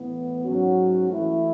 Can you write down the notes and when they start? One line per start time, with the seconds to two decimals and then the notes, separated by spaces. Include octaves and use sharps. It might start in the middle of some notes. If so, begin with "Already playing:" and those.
Already playing: A2 E3 B3
0.44 G#2 F#3 C#4 F#4
1.08 E3 A3 E4